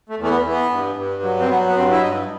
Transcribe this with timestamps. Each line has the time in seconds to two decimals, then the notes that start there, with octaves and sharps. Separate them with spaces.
0.09 A3
0.17 E2
0.23 A3
0.29 B3
0.43 E3
0.50 B3
0.70 G2
0.95 G2
1.23 F#3
1.40 C4
1.48 F#3 B3
1.68 B3
1.75 G2 C4
1.91 E4
2.01 G2 D#4